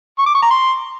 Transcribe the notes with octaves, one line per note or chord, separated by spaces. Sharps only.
C#6
D6
C#6
A#5
C6